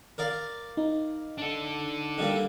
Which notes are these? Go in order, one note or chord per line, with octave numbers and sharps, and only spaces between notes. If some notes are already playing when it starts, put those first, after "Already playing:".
A#4 D5 F5
D#4
D4 A4
D3 G3 A#3